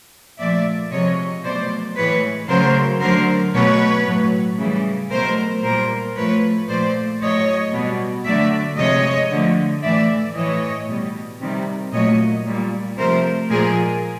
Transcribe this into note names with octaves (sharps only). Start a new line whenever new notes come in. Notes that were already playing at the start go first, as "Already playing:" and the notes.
A#2 F3 A3 D5 E5
C3 F3 G#3 C#5 D#5
B2 F#3 A3 C5 D5
A2 E3 G#3 B4 C#5
C#3 F#3 A3 A#4 C5
D3 F#3 A3 A#4 C5
B2 F#3 A3 B4 C#5
A2 F#3 A3
C#3 E3 G3
B2 F#3 A3 A#4 C5
A#2 G3 A#4 C5
A2 F3 A3 B4 C#5
A#2 F3 A3 C5 D5
A2 F#3 A3 C#5 D#5
B2 G3
D3 F#3 A3 D5 E5
C3 F3 G#3 C#5 D#5
D3 F3 A3
A2 E3 A3 D5 E5
A2 E3 A3 C#5 D#5
B2 G3
C3 D#3 G3
A#2 F#3 A3 C#5 D#5
A#2 G3
C3 F3 A3 A#4 C5
A#2 F3 G#3 G#4 A#4